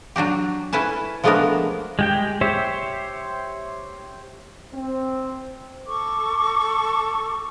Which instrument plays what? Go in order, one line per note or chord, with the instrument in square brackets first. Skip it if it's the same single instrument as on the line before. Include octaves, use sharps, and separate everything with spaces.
[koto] F#3 D4 F#4 G4
C#4 E4 A4 B4 G#5 A5
F3 G#3 A3 B3 D4 A#4
[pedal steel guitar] G#3 G4 G5
G4 C5 C#5 E5
[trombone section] C4
[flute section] A4 C#6 D6